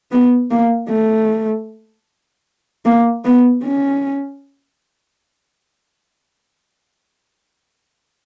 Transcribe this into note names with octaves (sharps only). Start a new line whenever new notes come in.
B3
A#3
A3
A#3
B3
C#4